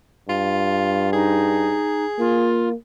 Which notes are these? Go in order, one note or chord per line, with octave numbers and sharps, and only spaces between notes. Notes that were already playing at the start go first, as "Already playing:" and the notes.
G2 F4
D#4 G#4
A#3 F4